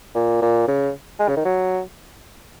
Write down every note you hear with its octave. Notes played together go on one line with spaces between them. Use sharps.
A#2
A#2
C#3
G#3
C#3
D#3
F#3